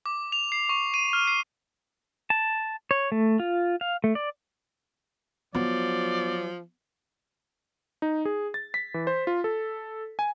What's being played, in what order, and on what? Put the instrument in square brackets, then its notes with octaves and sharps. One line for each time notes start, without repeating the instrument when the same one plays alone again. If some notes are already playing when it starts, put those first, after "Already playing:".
[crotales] D6
F7
C7
C#6
D#7
F6
C7
[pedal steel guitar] A5
C#5
A3
F4
F5
A3
D5
[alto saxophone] F3 [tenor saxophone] F#3 [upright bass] B3 [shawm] D5
[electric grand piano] D#4
G#4
A6
B6
E3
C5
F4
A4
G#5